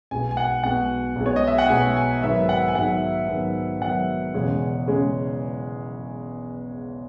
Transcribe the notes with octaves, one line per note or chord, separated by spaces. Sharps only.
B1 B2 G#3 G#5
G#5
F#5
B1 B2 G#3 F#5
B1 B2 G#3
C#5
D#5
E5
F#5
B1 B2 G#3 G#5
G#5
G#2 D#3 F#3 B3 E5
F#5
G#5
G#2 D#3 F#3 B3 F#5
G#2 D#3 F#3 B3
G#2 D#3 F#3 B3 F#5
E1 E2 C#3 G#3 C#4
C#3 G#3 C#4